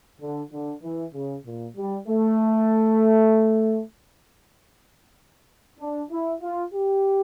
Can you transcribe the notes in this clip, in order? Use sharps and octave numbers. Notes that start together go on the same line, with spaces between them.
D3
D3
E3
C#3
A#2
G3
A3
D4
E4
F4
G4